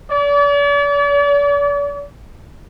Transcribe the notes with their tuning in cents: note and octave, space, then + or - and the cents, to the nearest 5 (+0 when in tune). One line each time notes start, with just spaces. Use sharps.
D5 -45